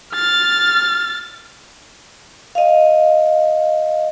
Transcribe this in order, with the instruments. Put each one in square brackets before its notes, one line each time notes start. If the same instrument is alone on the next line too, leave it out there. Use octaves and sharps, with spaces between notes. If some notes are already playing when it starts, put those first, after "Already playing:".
[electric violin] F6 A6
[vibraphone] D#5 F5